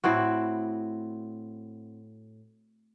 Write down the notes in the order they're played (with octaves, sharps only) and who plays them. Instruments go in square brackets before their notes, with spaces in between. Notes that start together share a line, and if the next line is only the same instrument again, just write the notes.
[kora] A2 C4 E4 F#4